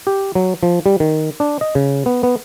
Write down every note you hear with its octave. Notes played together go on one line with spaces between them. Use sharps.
G4
F#3
F3
G3
D#3
D4
D#5
C#3
B3
B3